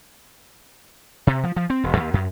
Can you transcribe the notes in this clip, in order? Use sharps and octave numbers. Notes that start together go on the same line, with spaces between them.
C3
F3
F3
C4
E1
D#2
F#2